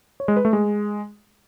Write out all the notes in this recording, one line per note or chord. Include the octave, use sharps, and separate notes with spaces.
C#5
G#3
B4
A3
G#3